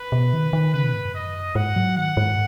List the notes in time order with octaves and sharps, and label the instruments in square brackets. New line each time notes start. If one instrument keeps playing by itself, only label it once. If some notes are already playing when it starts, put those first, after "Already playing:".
Already playing: [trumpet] B4
[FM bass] B2
D#3
D#3
[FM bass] C#3 [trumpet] B4
[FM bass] B2
G#2
F#2
[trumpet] D#5
[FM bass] G#2 [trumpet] F#5
[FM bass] F#3
[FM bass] D#3 [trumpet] F#5
[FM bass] G#2